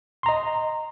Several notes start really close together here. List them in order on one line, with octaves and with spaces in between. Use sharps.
C6 A#5 D#5